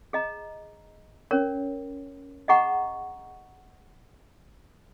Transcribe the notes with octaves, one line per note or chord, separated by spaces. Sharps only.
G#4 D#5 A#5
C#4 A#4 C#5
G#4 D#5 F#5 A#5 C#6